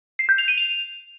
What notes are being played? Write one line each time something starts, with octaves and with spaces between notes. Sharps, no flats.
C7
G6
F7
D#7
F7